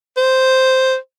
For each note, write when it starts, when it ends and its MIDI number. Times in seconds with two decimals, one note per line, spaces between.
0.17 0.96 72